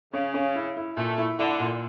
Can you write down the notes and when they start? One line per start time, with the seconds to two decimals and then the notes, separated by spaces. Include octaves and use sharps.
0.13 C#3 C#4
0.34 C#4
0.55 E4
0.77 E4
0.97 A#2 A3
1.18 E4
1.39 D3 E4
1.60 A#2